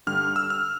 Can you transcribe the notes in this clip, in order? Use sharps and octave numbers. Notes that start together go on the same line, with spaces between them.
G2 D3 G3 F6
E6
F6